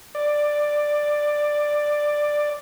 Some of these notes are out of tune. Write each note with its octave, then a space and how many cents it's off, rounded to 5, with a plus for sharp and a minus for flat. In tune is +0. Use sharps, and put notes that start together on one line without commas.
D5 +10